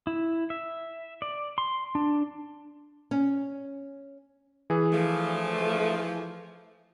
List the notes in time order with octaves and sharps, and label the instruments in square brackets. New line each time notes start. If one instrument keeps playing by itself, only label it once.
[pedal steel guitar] E4
E5
D5
C6
D4
[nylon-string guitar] C#4
[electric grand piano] E3 G#4
[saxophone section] F3 [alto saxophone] A3